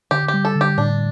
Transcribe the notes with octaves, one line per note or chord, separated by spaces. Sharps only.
D3 G4
G4
G3
A4
D3
G4
A2 D4